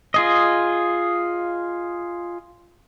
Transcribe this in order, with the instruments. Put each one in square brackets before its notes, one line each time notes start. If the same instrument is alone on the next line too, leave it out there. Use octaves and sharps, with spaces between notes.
[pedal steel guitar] F4 G#4 D#5